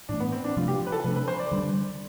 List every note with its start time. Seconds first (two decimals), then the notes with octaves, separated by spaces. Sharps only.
0.09 A2 E3 A3 D4
0.20 B3
0.32 C4
0.44 D4
0.57 C3 F3 A3 D4 F4
0.68 G4
0.87 B4
0.92 A4
1.04 C3 F3 A3 D4 B4
1.16 B4
1.28 C5
1.40 D5
1.51 D3 G3 D4